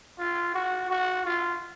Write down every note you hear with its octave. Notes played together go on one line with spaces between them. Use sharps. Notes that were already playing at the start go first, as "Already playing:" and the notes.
F4
F#4
F#4
F4